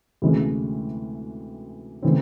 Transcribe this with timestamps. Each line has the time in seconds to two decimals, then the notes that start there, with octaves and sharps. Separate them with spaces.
0.22 D2 C3 E3 G#3 C#4
2.02 C#3 E3 A3 C4